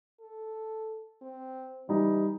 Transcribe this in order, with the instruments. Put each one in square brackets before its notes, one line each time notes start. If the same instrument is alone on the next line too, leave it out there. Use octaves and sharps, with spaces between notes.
[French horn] A4
C4
[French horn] E3 [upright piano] G3 D#4